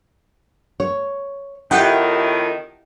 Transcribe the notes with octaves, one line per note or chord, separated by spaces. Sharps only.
C#5
F2 A2 D#3 E4 G4 F#5 G5